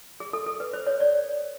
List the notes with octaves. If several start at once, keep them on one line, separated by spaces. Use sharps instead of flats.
G#4
A4
A4
B4
C5
C#5
D5